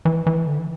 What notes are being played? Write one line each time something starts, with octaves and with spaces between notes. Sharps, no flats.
E3
E3
D3
E3